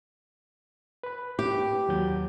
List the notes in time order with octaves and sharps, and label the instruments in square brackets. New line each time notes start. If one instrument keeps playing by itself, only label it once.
[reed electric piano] B4 B5
[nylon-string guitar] G4
[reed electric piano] D#2 F#3 G6